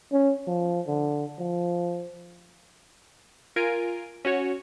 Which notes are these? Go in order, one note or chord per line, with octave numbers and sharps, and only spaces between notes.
C#4
F3
D3
F3
F4 A#4 G#5 D7
C#4 F#4 C#5